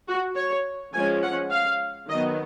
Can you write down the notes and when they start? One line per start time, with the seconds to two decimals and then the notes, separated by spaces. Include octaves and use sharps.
0.08 F#4
0.36 C#5
0.93 F3 G#3 C#4 G#5
1.22 F#5
1.50 F5
2.08 D#3 F#3 B3 D#5